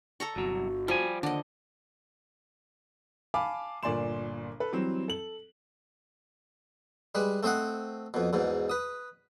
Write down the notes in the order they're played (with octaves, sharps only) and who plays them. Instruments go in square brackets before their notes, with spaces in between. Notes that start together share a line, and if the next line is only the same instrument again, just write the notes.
[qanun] A4 A#5 C#6
[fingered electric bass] G1 [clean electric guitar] C2 F#3 [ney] F#4
[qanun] F3 [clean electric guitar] G3 G#5
[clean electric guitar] D#2 [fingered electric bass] D3 [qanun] D4 D#5 [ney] F#5
[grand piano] F5 G#5 A5 B5 D6
G1 A#2 D5 G#5 C6 E7
A4 B4
E3 F#3 G3 C4
A4 F#7
[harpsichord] G3 G#3 B4
A3 C4 C5 D#5 F#5
F2 B2
E2 G#2 B2
B4 D#6